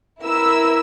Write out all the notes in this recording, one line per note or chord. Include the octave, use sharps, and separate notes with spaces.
E4 A#4 E6